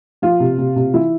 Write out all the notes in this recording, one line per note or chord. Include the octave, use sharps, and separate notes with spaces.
F3 F4
C3
C3
C3
E3 E4